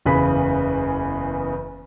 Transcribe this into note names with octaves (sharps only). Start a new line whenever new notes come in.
F#1 E2 C#3 B4 B5 B6